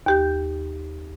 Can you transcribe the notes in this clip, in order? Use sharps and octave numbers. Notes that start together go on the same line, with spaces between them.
D#2 G4 G6